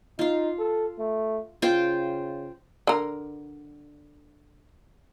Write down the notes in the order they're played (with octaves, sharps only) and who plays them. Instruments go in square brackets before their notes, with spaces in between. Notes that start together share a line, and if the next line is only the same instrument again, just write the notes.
[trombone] D#4 [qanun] F4 F5
[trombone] A4
A3
[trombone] C#3 [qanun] F4 C5 G5
[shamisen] D3 A#4